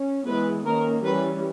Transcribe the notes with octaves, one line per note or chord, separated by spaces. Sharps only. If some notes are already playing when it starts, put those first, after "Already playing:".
Already playing: C#4
E3 G#3 B3 B4
D#3 A#3 C#4 A#4
E3 G3 C#4 B4